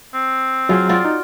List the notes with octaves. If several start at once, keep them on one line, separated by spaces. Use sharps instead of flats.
C4
F#3 F4 G#4
F4 F#4 D5
D#4